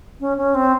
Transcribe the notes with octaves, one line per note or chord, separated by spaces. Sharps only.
C#4
C#4
C4